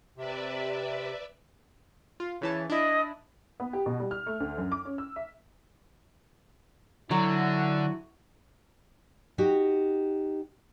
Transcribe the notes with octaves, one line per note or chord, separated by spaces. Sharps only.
C3 B4 D5 E5
F4
C#3 E3 C#5 A5
D4 E4 D#5
B3
G4
B2
G3
F6
A3
D2
F#2
D6
C#4
E6
E5
D3 F#3 E4 F#4
D#4 F#4 G4